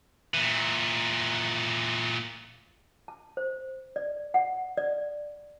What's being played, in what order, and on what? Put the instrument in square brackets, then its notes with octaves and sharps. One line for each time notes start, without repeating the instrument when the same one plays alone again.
[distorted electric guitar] A#2 E3
[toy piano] A5
C5
D5
F#5
D5